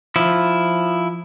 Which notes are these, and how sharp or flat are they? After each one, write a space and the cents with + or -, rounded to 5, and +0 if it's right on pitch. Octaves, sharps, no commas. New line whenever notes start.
F3 +0 E4 +0